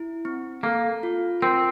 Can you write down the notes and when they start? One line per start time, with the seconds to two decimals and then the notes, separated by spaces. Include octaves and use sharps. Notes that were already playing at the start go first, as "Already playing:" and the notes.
Already playing: E4
0.25 C4
0.63 A#3 A4
1.03 F4
1.42 C4 A#4